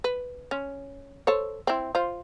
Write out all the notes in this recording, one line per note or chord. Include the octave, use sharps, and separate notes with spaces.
B4
C#4
A4 C5 C#5
C4 E4
F4 C5